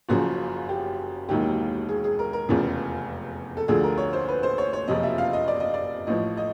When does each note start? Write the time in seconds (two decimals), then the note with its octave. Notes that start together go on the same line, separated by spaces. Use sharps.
0.09 F#1 F#2 C#3 F3 F#4
0.69 G4
1.29 E1 D#2 D#3 F#3 G4
1.89 G#4
2.04 G#4
2.19 A#4
2.33 A#4
2.49 F1 E2 C#3 F3
3.57 A4
3.68 D2 D3 F3 G#4
3.84 A#4
3.98 C#5
4.13 C5
4.28 B4
4.43 C5
4.58 C#5
4.73 C#5
4.88 F#1 F2 C3 F3 D#5
5.03 E5
5.18 F5
5.33 D#5
5.48 D5
5.60 D#5
5.74 D5
6.07 A1 A2 F3 D#5
6.37 D#5